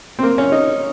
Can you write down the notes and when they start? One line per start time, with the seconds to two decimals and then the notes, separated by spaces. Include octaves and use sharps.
0.19 C4
0.23 A#3
0.38 C#4
0.52 D#4